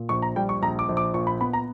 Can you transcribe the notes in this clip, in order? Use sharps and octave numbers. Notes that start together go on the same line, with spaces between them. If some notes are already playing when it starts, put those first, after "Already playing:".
Already playing: A#2
A#1 C#6
A#5
G3 G5
C#6
A#1 A#5
D6
A#1
D6
A#2 C#6
B5
B3 B5
A#5